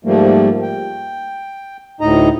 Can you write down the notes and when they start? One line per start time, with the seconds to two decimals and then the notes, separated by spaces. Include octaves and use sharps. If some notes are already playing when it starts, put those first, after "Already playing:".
0.05 G#2 F3 G3 A3 A#3
0.62 G5
2.01 D2 A2 D#4 D#5 A#5